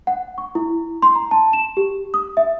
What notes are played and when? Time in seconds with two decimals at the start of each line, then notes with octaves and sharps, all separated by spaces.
0.07 F#5
0.38 C#6
0.55 E4
1.02 C6
1.15 A#5
1.31 A5
1.53 E7
1.77 G4
2.14 D#6
2.37 E5